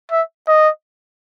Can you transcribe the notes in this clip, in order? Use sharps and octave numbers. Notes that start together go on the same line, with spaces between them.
E5
D#5